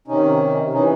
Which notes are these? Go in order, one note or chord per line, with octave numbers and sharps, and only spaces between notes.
C3 D#3 C#4 D#4
C3 E3 C#4 D#4